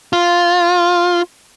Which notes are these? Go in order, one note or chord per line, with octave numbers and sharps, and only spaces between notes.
F4